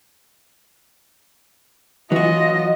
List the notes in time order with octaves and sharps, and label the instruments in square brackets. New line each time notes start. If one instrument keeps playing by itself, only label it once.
[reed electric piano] E3 [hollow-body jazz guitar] F#3 F#4 [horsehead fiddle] F4 D#5